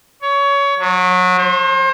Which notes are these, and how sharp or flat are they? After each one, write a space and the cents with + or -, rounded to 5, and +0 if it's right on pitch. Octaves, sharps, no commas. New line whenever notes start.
C#5 +20
F#3 -25
C5 +35